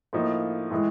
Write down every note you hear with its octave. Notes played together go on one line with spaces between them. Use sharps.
A2 F3 A#3 D#4
A2 E3 G#3